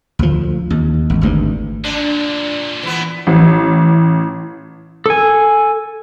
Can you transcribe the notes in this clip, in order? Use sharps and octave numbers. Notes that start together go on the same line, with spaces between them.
D2 F3
D#2
G#1
G#1 D2 G2
A#2 D3 D4
E3 B3
A1
A4 G#5